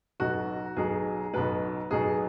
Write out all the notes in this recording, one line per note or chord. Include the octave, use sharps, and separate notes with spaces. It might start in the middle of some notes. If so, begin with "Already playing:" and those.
B1 B2 F#3 F#4
B1 B2 F#3 G#4
B1 B2 F#3 B4
B1 B2 F#3 G#4